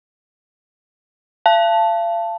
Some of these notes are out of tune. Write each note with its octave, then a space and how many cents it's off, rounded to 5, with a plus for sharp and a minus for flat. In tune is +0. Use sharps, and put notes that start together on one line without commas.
F5 -40 A5 +0